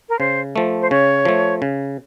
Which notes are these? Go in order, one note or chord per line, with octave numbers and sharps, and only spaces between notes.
A#4
C#3 C5
F3 A3
C5
C#3 C#5
F3 A3
C#3